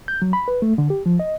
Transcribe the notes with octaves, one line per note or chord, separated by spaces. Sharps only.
G6
F#3
B5
B4
A3
D3
G4
F3
D#5